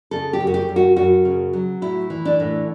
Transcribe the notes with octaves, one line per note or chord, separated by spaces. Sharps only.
C#3 A4
G4
F#2
F#4
G4
F#2
F#4
F#2 F#4
C#3
F#3
A2 E4
E3
D4
A2